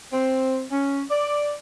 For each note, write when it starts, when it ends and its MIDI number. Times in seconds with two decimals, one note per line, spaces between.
0.13 0.65 60
0.72 1.03 61
1.11 1.53 74